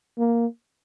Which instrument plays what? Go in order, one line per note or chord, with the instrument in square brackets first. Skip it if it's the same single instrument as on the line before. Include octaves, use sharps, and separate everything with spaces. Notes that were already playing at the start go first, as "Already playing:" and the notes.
[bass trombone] A#3